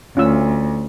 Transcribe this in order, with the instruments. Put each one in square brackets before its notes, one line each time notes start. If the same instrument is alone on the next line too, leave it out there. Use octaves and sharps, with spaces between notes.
[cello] D2 [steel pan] C#4 F4 E6